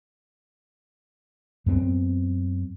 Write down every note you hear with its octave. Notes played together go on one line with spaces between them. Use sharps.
F#2 B3 C4